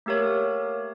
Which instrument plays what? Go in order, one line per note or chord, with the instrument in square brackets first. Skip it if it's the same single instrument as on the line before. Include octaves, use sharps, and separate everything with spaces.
[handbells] A3 A#3 G4 A#4 C#5